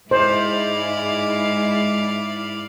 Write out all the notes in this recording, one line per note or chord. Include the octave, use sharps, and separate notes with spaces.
G#2 G#3 E4 C5 D5 F5